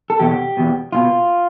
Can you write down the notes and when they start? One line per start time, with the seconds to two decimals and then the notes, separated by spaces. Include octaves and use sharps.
0.10 A4
0.20 E2 B2 G4
0.57 E2 B2
0.92 B2 F4